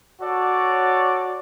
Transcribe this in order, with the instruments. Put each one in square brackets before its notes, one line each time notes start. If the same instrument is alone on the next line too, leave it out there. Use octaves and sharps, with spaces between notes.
[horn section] F#4 A4 C#5 D5